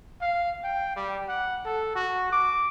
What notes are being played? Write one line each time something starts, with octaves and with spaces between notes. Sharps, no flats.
F5
G5
G3
F#5
A4
F#4
D6